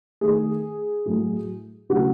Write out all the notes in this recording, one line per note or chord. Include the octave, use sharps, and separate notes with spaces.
D#3 A3 G#4
A2 F#3 A3
C#3 F#3 A3 F#4